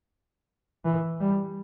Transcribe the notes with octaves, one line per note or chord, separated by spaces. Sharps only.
E3
G3